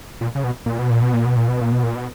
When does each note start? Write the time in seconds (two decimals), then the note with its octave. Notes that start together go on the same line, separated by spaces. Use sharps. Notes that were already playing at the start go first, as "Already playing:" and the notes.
0.21 A#2
0.35 C#3
0.44 B2
0.66 A#2
0.79 B2
0.90 A#2
1.02 B2
1.13 A#2
1.25 B2
1.36 A#2
1.48 B2
1.61 A#2
1.72 B2
1.83 A#2
1.95 B2